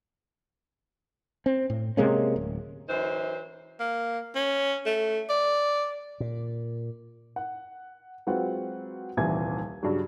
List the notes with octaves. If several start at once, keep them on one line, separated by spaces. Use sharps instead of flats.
C4
A2
C3 G#3 A#3 C#4
D1
F#2 E3 D#4 C5
A#3
C#4
A3
D5
A#2
F#5
F#3 G#3 C4 F4 B4 F#5
D#1 C2 E3 G#5 G#6
G2 C#3 F#3